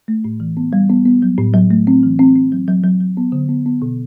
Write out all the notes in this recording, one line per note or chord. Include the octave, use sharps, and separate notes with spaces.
A3
A2
E3
B3
G3
B3
B3
F#3
A2
F#3
A3
C4
E3
C4
C4
F#3
F#3
F#3
F#3
B3
D3
B3
B3
B2